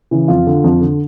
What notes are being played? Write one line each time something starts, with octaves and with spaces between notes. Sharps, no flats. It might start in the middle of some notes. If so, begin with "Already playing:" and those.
C#3 E3
F2 F4
D3
F2
D3